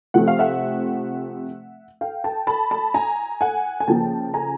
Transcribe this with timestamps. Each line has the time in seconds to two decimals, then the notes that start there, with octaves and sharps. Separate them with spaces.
0.14 C3 F3 A3 C4 F#5
0.28 F5
0.39 E5 F#5
2.01 F5 G5
2.24 G5 A5
2.47 A5 B5
2.71 A5 B5
2.94 G#5 A#5
3.41 F#5 G#5
3.80 G#5
3.88 C#3 F3 A#3 G5 A5
4.34 G#5 A#5